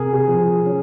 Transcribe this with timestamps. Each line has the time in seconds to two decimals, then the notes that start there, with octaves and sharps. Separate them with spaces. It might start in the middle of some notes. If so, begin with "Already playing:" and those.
Already playing: C3 G#4 A#4
0.13 G#4
0.28 F3
0.66 C#4